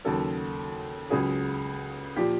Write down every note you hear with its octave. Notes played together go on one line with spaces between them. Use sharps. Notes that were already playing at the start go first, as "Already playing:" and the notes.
D#2 C#3 F#3 A4
C#2 C#3 F#3 G#4
A#2 F3 G4